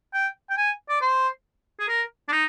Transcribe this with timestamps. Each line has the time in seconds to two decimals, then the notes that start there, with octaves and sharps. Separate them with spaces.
0.14 G5
0.50 G5
0.58 G#5
0.89 D5
1.01 C5
1.80 G#4
1.89 A#4
2.28 D4
2.32 D#4